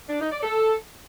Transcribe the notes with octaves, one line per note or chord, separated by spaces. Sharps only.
D4
D#4
D5
A4